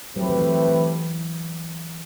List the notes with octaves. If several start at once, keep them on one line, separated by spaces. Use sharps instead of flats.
F#3 A3 C4 E4 G4 B4
E3
E3
E3
E3